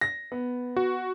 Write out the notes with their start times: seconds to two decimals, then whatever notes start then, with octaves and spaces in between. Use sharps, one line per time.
0.01 A#6
0.32 B3
0.77 F#4